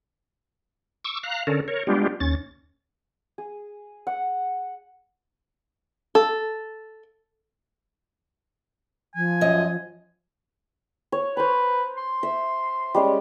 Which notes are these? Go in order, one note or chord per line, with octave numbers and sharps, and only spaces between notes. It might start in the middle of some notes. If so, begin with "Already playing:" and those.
C#6 D6 E6
F5 A#5 F#6
D3 C#4 A4 A#4
A#4 C#5
G3 G#3 B3 D4 F4 G4
D#2 C#4 A6
G#4
F#5
A4
F3 G#5
F#2 D#5
C#5
B4 C5 A#5
C6
E5
G3 G#3 C#4